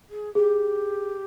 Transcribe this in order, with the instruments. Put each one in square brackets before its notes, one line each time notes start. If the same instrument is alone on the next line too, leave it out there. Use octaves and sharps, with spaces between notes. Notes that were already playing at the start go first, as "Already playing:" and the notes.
[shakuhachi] G#4
[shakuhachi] G4 [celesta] G#4